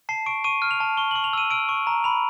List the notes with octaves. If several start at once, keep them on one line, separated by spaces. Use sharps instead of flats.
A5 C7
C#6 D7
C#6 D#7
F6
F7
A5
C#6 G7
F#7
C#6
F7
E6 D#7
E6 D7
C#6
A#5
B5 F7